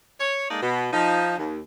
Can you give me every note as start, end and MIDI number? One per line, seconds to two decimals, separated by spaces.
0.20 0.48 73
0.50 0.62 56
0.50 0.62 58
0.50 0.62 63
0.50 0.62 69
0.50 0.62 74
0.62 0.90 47
0.93 1.37 53
0.93 1.37 63
1.38 1.60 39